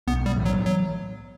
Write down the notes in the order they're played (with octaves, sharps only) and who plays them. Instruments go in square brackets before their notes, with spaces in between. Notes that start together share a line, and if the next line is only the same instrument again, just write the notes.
[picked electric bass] B1 [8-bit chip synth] B3
[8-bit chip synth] G3
[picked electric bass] A2 E3 B3
[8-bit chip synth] F#3
F#3